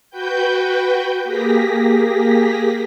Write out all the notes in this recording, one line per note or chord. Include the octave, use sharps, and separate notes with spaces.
F#4 B4 G5 G6
A#3 G4 G#4 A#6 B6